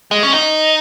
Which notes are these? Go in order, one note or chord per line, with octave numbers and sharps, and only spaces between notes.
G#3
C#4
D#4